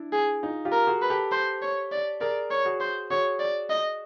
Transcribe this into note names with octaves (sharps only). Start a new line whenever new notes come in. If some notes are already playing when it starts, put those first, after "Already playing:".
Already playing: D4 E4
G#4
D#4 F4
F4 G4
A#4
F#4 G#4
B4
G4 A4
C5
C#5
D5
G#4 A#4 D5
C#5
F#4 G#4
C5
F#4 G#4 C#5
D5
D#5